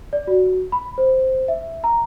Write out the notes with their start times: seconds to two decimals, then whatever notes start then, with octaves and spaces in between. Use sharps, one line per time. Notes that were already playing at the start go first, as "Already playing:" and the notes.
0.13 D5
0.27 F#4
0.72 B5
0.98 C5
1.48 E5
1.84 A#5